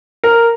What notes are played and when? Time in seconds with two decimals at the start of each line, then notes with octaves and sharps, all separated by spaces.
0.24 A#4